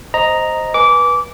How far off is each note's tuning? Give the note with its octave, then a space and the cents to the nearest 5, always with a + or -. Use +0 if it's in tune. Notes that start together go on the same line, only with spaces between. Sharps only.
C5 +0 D#5 +0 A#5 +0
B4 -20 G#5 +0 D6 -20